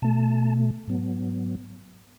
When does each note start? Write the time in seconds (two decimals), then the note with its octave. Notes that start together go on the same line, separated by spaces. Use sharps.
0.02 B2 A3 A5
0.87 G#2 F#3 B3